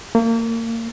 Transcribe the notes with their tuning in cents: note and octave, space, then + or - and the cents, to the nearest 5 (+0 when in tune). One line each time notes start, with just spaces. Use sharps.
A#3 -30